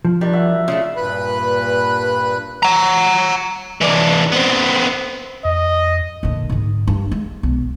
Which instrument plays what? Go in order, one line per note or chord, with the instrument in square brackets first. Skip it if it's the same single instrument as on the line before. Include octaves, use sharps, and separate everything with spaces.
[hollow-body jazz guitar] F3
[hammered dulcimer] D#3 D4 [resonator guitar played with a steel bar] G3
[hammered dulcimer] F#4 E5 F#5
[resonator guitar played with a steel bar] C#3 G#3 A3 [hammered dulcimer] F4 E5
[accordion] G2 A#2 B4 B5 F#6
[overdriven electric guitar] F#5 A#5
E3 D4
B3 C4
[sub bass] F2 [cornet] D#5
[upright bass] A#2 D3
G#2 D3
G2
G#3
B1